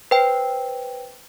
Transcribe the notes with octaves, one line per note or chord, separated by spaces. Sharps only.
B4 C5 G5